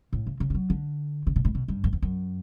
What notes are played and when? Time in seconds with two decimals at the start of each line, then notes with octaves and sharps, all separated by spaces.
0.13 A2
0.26 C#3
0.40 C#3
0.50 G3
0.54 F#3
0.70 D3
1.27 C#3
1.36 B2
1.45 A2
1.55 B2
1.68 G2
1.84 F#2
1.93 E2
2.02 F#2